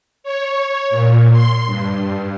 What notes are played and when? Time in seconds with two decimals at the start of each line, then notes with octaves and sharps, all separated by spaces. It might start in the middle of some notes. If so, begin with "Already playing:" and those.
0.23 C#5
0.90 A#2
1.32 C6
1.66 G2